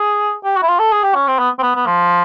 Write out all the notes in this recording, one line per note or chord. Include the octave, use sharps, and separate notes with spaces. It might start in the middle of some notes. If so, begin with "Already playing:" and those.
Already playing: G#4
G4
F#4
E4
F4
A4
G#4
G4
C#4
C4
B3
C4
B3
B3
F3